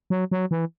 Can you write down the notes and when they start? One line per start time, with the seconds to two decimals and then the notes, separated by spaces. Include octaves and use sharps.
0.10 F#3
0.31 F#3
0.51 E3